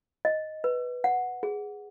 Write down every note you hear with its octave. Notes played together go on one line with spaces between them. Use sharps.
D#5
B4
F#5
G#4